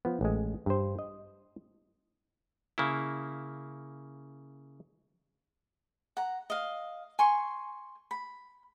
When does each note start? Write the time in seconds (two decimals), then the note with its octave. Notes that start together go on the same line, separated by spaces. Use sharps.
0.05 F3 B3
0.21 A1 G#3
0.66 G2 C5
0.99 D#5
2.78 C#3 A#3 E4
6.17 F#5 A#5
6.50 D#5 F5
7.19 G#5 C6 C#6
8.11 B5